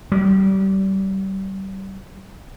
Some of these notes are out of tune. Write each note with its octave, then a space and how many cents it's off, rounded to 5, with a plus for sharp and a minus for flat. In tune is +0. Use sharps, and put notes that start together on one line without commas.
G3 -30